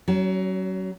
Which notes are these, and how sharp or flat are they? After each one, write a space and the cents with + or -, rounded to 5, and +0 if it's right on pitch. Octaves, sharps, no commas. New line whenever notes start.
F#3 +30 C#4 +0